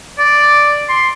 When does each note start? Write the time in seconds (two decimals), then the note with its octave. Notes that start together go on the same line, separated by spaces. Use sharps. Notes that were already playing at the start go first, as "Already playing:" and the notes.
0.19 D5
0.89 C6